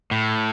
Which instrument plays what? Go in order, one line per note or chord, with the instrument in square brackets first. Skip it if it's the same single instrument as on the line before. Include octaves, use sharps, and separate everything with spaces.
[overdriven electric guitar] A2